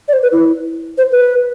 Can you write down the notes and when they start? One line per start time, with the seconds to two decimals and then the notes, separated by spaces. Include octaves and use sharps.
0.08 D5
0.13 C5
0.22 B4
0.32 E4
0.97 C5
1.11 B4